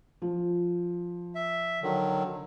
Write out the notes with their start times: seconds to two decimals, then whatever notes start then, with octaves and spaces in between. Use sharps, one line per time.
0.22 F3
1.35 E5
1.83 D3 D#3 F#3